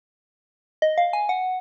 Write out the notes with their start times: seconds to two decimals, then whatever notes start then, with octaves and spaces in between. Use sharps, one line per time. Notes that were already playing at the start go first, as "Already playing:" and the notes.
0.82 D#5
0.98 F5
1.13 G#5
1.29 F#5